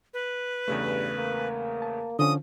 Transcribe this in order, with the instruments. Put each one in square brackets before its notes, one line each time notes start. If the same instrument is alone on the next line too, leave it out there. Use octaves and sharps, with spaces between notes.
[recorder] B4
[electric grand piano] E2 C#3 A3 [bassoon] G2
[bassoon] A#3
[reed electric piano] A5
[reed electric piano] D3 C#4 [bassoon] F3 [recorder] D#6